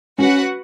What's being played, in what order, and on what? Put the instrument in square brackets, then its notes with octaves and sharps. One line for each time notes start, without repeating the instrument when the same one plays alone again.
[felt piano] C#4 [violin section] F#4 B4 F#5